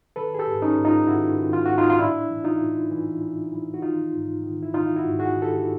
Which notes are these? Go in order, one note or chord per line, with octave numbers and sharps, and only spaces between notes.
D#3 A4 B4
G#4
G4 A4
G#2
C#4 D#4
G#2
D#4 F4
D#3 E4 F#4
D#3
F4
G#2 F#4
D#4 F4
F4
A2 D4 E4
E3
D#4 F4
A2
E3
E3
E3
F#4
D#3 D#4 F4
G#2
D#3
E4
D#3 D#4 F4
E4 F#4
G#2
F#4 G#4
D#3
G4 A4